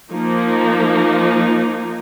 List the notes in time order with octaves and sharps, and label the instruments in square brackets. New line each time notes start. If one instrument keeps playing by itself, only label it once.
[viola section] F3 A#3 D#4